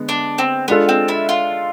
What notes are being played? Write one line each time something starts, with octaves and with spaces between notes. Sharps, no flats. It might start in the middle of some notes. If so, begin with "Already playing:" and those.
Already playing: D3 G#3 B3
D4
C4
G#3 B3 D4 F4 A4
C4
E4
F4